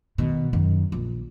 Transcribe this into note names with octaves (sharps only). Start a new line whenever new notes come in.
B2 D#3
F#2 D#3
A#1